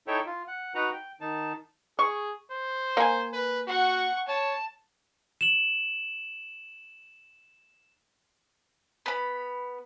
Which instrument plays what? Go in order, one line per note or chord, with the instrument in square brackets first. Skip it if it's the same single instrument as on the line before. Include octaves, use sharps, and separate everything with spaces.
[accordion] D#4 E4 A4 C#5 E5 G5
F4
F#5
D#4 F#4 B4 F#5 A#5
G5
D#3 D#4 A5
[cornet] G#4 [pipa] C#6
[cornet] C5
[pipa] A#3 G#5
[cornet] B4
[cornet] F#4 [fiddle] F#5 C#6
[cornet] C#5 [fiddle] A5
[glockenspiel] E7 F#7
[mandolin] B3 B5